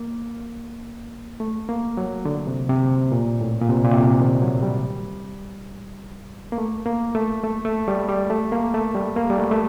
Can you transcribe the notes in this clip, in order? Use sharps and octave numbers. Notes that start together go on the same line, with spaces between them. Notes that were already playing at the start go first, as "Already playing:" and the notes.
Already playing: A#3
A3
A#3
F#3
D3
C3
C3
A#2
A2
A#2
C3
A#2
C3
D3
D#3
F#3
G3
A#3
A3
A#3
A3
A3
A3
G3
G3
A3
A#3
A3
G3
A#3
G3
A3
A3